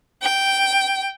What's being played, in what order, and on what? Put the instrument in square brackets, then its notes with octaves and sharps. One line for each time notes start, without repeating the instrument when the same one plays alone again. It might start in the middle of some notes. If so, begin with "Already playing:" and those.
[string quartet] G5